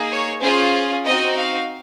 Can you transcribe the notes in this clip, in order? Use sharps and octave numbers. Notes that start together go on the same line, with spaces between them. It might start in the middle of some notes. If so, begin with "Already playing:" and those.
Already playing: A#3 D#4 G#4
C#5
C#4 F4 G#4 C5
C4 D#4 F#4 D#5
F5